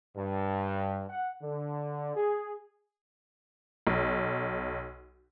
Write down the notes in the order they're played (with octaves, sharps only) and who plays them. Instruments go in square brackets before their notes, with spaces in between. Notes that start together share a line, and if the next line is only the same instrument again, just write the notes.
[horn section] G2
F#5
D3
G#4
[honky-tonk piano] B1